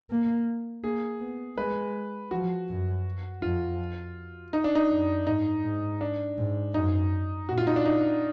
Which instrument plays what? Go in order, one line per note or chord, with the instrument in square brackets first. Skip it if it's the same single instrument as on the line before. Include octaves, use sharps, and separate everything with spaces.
[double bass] A#3
[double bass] A#3 [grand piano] G#4
[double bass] B3
[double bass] G#3 [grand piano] B4
[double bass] F3 [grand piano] F#4
[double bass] F#2
[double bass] F2 [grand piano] F4
[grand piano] D#4
D4
D#4
[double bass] F#2
[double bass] G#2 [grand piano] D#4
[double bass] G#2
[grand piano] D4
[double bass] G#2
[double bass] F#2 [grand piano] D#4
[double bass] A#2 [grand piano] F#4
[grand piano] F4
D#4
D4
D#4